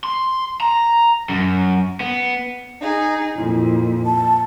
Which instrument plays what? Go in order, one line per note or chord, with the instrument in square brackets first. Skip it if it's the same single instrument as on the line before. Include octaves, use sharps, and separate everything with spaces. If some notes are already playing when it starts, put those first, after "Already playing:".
[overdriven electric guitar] C6
A#5
F#2
B3
[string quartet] D#4 G#4
[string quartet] F2 A#2 [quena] E4
[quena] A5